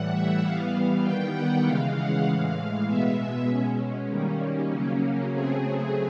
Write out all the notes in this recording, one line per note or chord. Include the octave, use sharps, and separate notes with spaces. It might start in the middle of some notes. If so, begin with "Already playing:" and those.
Already playing: A2 E3 G3 F#5
E5
E3 G3 B3 F5
D#3 G3 B3 G5
F#5
C#3 E3 G#3 F5
F#5
A2 E3 G#3 F5
B2 G#3 B3 E5
B2 G#3 C#4
D#3 G3 A#3 C#4
C#3 F#3 A#3 C#4
C#3 F#3 A3 C4 G#4